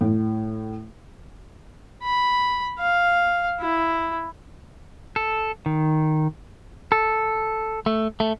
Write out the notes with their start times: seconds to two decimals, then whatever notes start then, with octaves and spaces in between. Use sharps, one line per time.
0.01 A2
2.03 B5
2.79 F5
3.61 E4
5.16 A4
5.66 D#3
6.92 A4
7.86 A3
8.20 A3